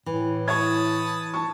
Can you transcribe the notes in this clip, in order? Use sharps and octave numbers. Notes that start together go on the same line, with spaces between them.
A2 E3
C#5 A5 B5 C#6 D#6 G#6
A5 C#6